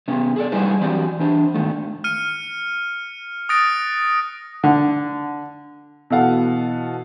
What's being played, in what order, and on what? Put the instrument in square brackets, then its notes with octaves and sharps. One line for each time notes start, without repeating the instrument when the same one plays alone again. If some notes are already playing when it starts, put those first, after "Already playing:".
[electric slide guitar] C3 B3 C#4
G#4 A4 D5
G3 D#4 E4 G#4 B4 C5
E3 F#3 C4 G4 D5
E3 D4 C5
G#2 D#3 A3
[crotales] F6 C#7 D#7
D#6 F#6 A6 A#6 D7
[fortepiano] D3
[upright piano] B2 E3 A4 F5 F#5